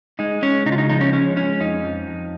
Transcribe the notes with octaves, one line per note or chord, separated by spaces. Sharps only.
G#3 D#4
G#3 C#4
C#3 D#4
F4
D#4
F3 D#4
C#4
G#3 C#4
G#3 C#4
F2 D#4
F3
F2